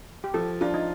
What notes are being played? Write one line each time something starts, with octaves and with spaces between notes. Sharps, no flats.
G4
F3 A4
D4 F4
D#4